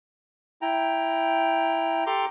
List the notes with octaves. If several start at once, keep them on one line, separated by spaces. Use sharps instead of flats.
E4 G5 A#5
G4 A4 A#5 C6 D6